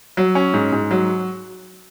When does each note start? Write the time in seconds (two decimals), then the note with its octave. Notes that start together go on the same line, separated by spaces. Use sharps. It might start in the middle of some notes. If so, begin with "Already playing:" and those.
0.17 F#3
0.35 C#4
0.54 G#2
0.72 G#2
0.91 F#3